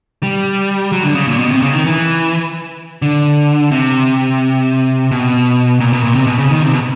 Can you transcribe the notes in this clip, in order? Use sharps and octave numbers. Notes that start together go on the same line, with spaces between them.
G3
F#3
D3
C#3
A#2
B2
C3
C#3
D#3
E3
D3
C3
B2
A#2
B2
A#2
C3
B2
C#3
D#3
C3
B2